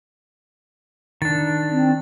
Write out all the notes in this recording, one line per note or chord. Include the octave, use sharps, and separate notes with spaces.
D#3 D4 A6
C4